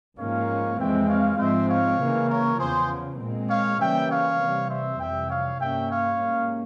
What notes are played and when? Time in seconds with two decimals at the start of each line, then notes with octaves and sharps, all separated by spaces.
0.19 G#2 F3 A#3 C#4 C#5 F5
0.79 F2 E3 G#3 C4 E5 G5
1.09 C#5 F5
1.39 G#2 F3 G#3 C4 C5 E5
1.69 C#5 F5
2.00 C#3 E3 A#3
2.30 A#4 C#5
2.59 E2 C#3 F3 G#4 C5
3.19 A#2 G#3 C4
3.50 C#5 F5
3.79 C#3 E3 G3 A#3 C#4 E5 G5
4.10 C#5 F5
4.40 C3 E3 G3 C4
4.70 C5 E5
5.00 F2 C3 E3 G3 E5 G5
5.30 C#5 F5
5.60 G2 G3 A#3 C#4 E5 G5
5.90 C#5 F5
6.20 G#2 G3 A#3 C#4